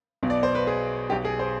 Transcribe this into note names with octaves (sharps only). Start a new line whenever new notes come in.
B1 B2
D5
C5
B4
G#4
B1 B2 G4
G#4
C5